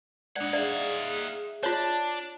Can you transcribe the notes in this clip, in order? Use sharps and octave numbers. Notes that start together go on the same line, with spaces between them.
G#3 D4 D#4 D5 F#5
G#4 D5 E5 F5
D4 F4 C#5 A5